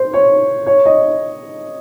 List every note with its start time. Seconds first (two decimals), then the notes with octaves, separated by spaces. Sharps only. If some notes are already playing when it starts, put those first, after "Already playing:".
Already playing: C5
0.13 C#5
0.66 C#5
0.85 D#5